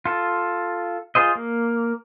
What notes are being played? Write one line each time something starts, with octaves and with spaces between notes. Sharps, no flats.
F4 A4
F4 G#4 C5 D#5
A#3